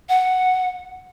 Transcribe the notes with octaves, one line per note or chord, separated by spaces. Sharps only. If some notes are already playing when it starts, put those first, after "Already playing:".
F#5